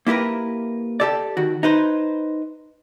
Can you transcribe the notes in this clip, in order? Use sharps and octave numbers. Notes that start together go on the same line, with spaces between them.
A#3 E4 G4 A#4 B4
G4 A4 D5
D#3 F#4
D#4 B4 C5